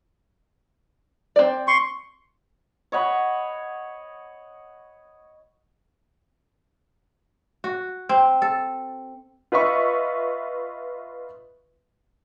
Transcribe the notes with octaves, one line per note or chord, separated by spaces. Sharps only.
C4 D5
C6 C#6
C#5 D#5 F#5 B5
F#4
C4
A4
F4 B4 D#5 E5 C#6